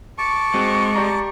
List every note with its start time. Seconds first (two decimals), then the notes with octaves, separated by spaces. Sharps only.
0.18 A5 C#6 D6
0.54 G#3 C4 F#4
0.96 G4 D5 A#5